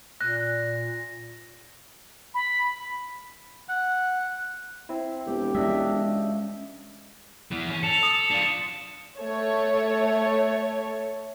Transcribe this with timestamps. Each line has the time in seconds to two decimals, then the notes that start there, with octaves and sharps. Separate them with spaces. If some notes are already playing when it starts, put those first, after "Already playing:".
0.21 A#2 F#6 A#6
2.34 B5
3.69 F#5
4.89 C4 E4
5.27 E1 G4
5.55 G#3 C#4 D4 D#5 E5
7.51 E3 B3
7.70 C#4
7.83 A4 C#7 E7 F7
8.03 D#6
8.31 D4 F4
9.20 A3 C#5